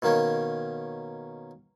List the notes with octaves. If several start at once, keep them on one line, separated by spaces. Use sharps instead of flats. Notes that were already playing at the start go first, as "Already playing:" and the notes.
B2 D#3 A#3 C#4